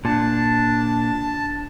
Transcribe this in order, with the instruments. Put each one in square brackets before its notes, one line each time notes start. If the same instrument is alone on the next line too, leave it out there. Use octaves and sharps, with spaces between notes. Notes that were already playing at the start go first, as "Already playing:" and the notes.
[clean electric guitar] A#2 [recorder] D4 [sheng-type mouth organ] A5